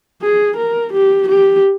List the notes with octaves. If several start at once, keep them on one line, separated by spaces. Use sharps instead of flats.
G#4
A#4
G4
G4